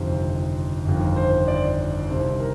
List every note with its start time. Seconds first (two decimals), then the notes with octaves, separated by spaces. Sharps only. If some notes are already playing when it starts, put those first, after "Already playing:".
Already playing: G1 F2 C3 D#3 C5
0.86 G1 F2 D#3
1.16 C5
1.48 D5
2.08 C2 C3 D#3 C5
2.39 A#4